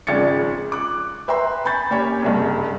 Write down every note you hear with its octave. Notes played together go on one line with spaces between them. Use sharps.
G#1 C#3 F3 D5 A6 C#7
D6 F#6
B4 E5 G5 A#5 C6
G#5 B5 C#6 G6 A6
A#3 C#4 G4 C#5 G5 G#5
F#1 C2 G2